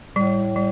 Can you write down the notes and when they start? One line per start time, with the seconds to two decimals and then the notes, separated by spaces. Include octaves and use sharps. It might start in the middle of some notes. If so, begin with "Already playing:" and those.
0.16 A2 G3
0.56 G3